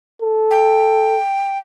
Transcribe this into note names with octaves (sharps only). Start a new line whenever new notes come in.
A4
G5